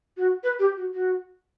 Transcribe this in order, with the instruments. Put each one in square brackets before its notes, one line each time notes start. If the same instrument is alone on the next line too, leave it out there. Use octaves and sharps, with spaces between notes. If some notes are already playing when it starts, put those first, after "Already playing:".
[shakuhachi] F#4
B4
G4
F#4
F#4